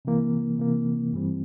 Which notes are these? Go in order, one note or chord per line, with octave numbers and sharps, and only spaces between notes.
C3 E3 A#3
C3 E3 A#3
G2 E3 G3 C4